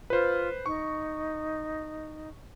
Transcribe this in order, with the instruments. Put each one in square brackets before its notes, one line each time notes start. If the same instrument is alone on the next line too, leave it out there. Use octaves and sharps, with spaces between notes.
[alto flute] F4 [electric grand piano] B4 C5
[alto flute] D#4 [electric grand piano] C#6